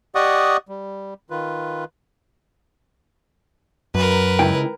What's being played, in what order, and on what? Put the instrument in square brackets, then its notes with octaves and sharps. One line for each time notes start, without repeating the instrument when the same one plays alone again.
[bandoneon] G4 D5 D#5 F#5 C#6 D#6
G3
D#3 F4 B4
[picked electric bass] F#2 [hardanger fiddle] A#4 B4
[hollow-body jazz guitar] C#2 E4 G5